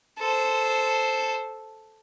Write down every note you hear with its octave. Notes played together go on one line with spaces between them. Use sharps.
A4 C5